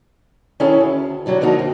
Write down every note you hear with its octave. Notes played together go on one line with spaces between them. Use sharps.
D#3 C#4 E4 G#4 A4 C#5
D2
D3 F#3 G3 F#4
D3 F3 A#3 D#4 F#4
F2